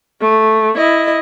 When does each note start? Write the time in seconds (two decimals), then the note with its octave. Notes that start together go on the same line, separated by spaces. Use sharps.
0.21 A3
0.77 E4 D#5